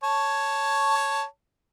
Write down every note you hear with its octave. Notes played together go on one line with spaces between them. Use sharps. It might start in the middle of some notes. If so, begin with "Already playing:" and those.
C#5 A5